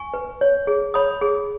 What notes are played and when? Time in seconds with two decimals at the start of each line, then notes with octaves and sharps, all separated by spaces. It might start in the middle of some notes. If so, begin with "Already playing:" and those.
Already playing: G#5 C#6
0.14 B4
0.41 C#5
0.67 G#4
0.94 C#5 B5 D#6
1.21 G#4